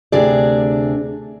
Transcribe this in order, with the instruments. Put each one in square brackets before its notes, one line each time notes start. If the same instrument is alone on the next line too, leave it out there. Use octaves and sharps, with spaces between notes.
[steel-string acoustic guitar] D2 C3 D4 G#4 D5